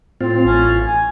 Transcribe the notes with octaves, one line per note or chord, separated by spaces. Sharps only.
A2 C4 F4
A1 C#4
G#5